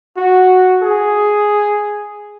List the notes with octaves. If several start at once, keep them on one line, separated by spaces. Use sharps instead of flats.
F#4
G#4